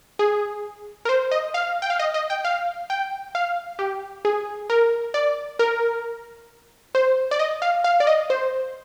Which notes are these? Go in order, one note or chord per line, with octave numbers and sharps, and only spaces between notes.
G#4
A#4
C5
D#5
F5
G5
F5
D#5
D#5
G5
F5
G5
F5
G4
G#4
A#4
D5
A#4
C5
D5
D#5
F5
F5
D5
D#5
C5